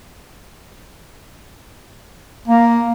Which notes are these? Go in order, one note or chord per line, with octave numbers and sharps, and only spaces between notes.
A#3